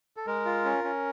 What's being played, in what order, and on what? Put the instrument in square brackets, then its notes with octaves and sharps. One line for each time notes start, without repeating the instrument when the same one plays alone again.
[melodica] A4
G#3 A#4
F4
C#4
C#4